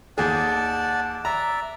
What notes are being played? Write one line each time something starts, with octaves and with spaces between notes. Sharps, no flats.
D#2 G#4 D5 F#5 A5
D5 E5 A#5